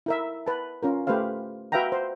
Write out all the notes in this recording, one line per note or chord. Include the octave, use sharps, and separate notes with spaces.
E4 A#4 E5
B4 A5
C#4 F4 A#4
A3 G4 B4 C5 F5
F#4 B4 E5 F5 G5 A#5
C5